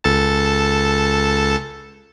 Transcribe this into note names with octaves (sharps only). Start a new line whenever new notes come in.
C#2 A4 A5